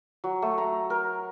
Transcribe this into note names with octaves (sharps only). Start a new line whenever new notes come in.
F#3
A3
A#5
A#4